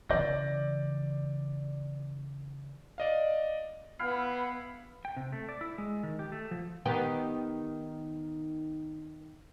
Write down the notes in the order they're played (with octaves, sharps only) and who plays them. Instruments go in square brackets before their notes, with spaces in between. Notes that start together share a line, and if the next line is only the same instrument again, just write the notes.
[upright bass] C#3 E3 [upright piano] D5 G6 A#6
[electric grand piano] D5 D#5 F5
[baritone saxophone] B3 [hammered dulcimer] E4 F5 G5
[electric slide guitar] G5
C3
A3
D5
E4
G#3
D#3
G4
A3
F3
[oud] D#3 B3 G4